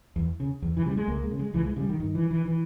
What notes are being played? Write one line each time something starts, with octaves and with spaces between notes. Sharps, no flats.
E2
C#3
E2
E3
C#3 G3
G#3
C#2 A#3
G#3
C#3
G#3
C#2 E3
G#3
C#3 G3
D#3
G2 D#3
E3
E3
E3